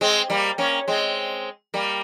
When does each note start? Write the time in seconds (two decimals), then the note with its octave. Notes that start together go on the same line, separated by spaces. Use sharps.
0.01 G#3 C4
0.30 G3 A#3
0.58 A#3 C#4
0.88 G#3 C4
1.74 G3 A#3